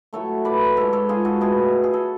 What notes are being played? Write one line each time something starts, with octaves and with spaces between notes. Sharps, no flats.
A2 F#3 A3 A4 C#5
B4 D5
G#2 G#3 A4 C#5
A4 C#5
F4 G#4
F#4 A4
B2 A3 G#4 B4
G#4
A4